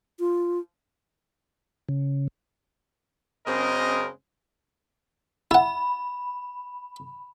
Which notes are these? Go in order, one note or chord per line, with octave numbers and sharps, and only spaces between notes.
F4
C#3
F#2 C#3 G#3 C4 A#4 D#5
E4 F#5 B5